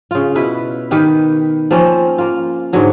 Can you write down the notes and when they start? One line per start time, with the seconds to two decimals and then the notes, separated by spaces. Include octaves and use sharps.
0.11 C#3 F4
0.35 B2 E4 B4
0.91 D#3 G4 B4
1.71 F3 A#3 C4 C#4
2.18 A#3 F4
2.73 G#2 D3 F#3 A3